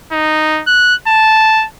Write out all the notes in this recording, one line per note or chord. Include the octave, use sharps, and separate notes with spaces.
D#4
F#6
A5